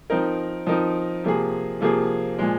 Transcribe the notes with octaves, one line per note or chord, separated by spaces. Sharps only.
F3 C4 D#4 A#4
F3 C4 D#4 A#4
C3 F3 A#3 G#4
C3 F3 A#3 G#4
A#2 F3 G#3